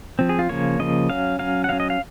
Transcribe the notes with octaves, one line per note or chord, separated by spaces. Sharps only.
F3 C4
G#4
F4
C#3 F3 A#3 C#5
C#3 F3 A#3 D#5
F#3 C#4 F5
F#3 C#4 F5
F#5
F#3 C#4 F5
D#5
F5